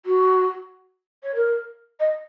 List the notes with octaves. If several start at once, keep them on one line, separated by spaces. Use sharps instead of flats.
F#4
C#5
A#4
D#5